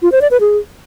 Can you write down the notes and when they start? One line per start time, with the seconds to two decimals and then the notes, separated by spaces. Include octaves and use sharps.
0.02 F4
0.12 C5
0.21 D5
0.31 B4
0.41 G#4